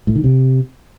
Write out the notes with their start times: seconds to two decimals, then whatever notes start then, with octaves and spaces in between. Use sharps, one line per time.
0.07 A2
0.15 D#3
0.24 C3